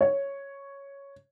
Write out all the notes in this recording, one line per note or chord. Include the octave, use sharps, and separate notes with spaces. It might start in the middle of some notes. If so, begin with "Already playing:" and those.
C#5